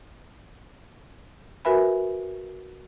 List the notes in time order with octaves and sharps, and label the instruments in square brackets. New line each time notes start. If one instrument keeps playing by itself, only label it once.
[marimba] F#4 A#4 B4 E5 G#5 B5